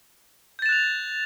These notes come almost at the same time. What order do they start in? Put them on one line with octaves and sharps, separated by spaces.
G6 A6 E7 F#6 F7